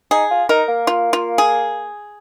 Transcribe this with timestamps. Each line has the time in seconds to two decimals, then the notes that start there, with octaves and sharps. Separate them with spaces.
0.11 D#4 G#4
0.30 F4
0.49 D#4 A#4
0.68 A#3
0.87 F4
1.13 F4
1.38 G#4